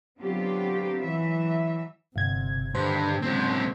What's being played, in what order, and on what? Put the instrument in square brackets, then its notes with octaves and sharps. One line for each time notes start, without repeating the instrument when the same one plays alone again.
[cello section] D3 F#3 B3 C4 F4 G4
E3 F#3 E5
[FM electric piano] G1 G#6 [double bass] C3
[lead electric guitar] G2 [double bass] D3 D#3 [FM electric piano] C5
[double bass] C#3 G#3 [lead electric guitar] F#3 C4